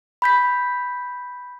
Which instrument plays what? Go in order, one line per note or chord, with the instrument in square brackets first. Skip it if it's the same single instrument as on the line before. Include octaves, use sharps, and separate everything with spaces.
[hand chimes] B5 G6 B6